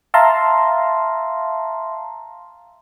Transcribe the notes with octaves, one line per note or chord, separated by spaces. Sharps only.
E5 F5 A5 A#5 C6